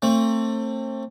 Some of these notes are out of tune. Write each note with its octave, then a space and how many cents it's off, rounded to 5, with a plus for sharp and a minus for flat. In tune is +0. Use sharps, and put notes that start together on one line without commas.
A3 +35 C4 +35